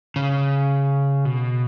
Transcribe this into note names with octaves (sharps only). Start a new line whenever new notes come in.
C#3
B2